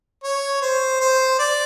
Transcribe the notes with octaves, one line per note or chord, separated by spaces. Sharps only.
C#5
C5
C5
D5